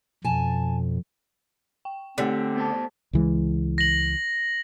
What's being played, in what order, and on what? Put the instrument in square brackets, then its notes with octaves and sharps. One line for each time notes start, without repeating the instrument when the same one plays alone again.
[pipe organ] F2 [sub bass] B2 [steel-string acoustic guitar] G#5 A5
[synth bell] G5
[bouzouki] D3 [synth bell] A3 G4 B6 [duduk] C4
[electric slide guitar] B3 C5 A5
[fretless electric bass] C#2 E3 G#3
[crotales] A#6 F#7